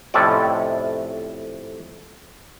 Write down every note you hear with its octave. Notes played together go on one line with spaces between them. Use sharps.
F2 A2 C3 C#4 A4 D5